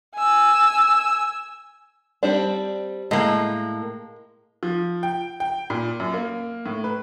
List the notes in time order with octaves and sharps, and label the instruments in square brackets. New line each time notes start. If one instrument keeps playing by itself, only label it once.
[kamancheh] G#5 E6
[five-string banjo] G3 C4 D4
[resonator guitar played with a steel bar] A2 A#3 [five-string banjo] G#3
[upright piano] F3
G5
G5
A#2
F#2
A#3
A2
B4